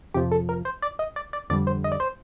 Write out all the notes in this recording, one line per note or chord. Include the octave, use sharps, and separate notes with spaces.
F2 C3 F3 G4
A4
A#4
C5
D5
D#5
D5
D5
F2 D3 G3 D5
C5
D#5
D5
C5